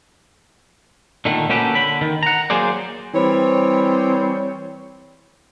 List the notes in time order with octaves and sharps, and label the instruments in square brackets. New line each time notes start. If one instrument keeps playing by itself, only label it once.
[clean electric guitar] A#2 D3 D#3 A3
A#3 C#4 F#4 G4 A4 B4
D3 B5
D#3
F#5 A#5
F#3 A#3 G#4 C5 D5
[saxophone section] E3 G3 C4 C#5